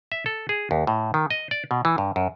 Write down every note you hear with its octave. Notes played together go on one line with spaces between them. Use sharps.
E5
A4
G#4
D#2
A2
D#3
D#5
D5
B2
E3
G2
F#2